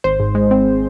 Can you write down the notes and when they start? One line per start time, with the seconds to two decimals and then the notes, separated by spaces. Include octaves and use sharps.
0.04 G#1 C5
0.20 G#2
0.35 G#3
0.51 C4